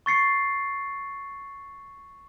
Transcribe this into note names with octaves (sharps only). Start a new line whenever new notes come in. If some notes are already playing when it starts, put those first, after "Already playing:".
C#6 A6 C7 C#7